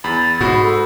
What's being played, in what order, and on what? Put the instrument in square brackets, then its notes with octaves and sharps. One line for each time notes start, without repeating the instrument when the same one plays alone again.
[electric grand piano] E2 B5 [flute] A6
[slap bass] G#2 [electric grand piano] F#4 [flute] B5
[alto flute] A4 [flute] B5